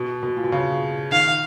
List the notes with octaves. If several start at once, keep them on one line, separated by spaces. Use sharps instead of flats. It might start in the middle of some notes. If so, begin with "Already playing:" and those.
Already playing: B2
B2
A#2
B2
C#3
D#3 F5